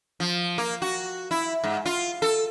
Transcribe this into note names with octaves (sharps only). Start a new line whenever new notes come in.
F3
A#3
F#4
E4
G#2
F4
A4